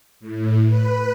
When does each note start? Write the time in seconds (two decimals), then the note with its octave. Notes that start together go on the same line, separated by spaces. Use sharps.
0.20 A2
0.65 B4